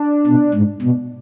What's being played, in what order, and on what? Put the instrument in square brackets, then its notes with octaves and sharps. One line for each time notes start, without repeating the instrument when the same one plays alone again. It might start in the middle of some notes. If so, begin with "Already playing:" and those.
Already playing: [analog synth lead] D4
[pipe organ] B2
G#2
B2